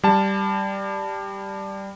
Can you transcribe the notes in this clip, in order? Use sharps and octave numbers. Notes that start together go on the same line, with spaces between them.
G3 A5